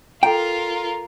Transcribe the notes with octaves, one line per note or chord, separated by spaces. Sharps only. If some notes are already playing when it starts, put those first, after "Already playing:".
F4 A4 A#4 G5 A#5